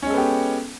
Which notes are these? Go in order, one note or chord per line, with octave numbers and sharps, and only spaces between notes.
G#3 B3 C#4 G4 A4